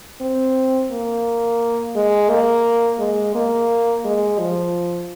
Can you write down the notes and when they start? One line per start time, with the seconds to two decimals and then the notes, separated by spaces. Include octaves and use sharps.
0.21 C4
0.91 A#3
1.95 G#3
2.30 A#3
2.99 G#3
3.35 A#3
4.04 G#3
4.39 F3